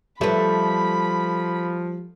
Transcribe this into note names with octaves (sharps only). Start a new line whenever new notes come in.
F3 G3 A3 B4 B5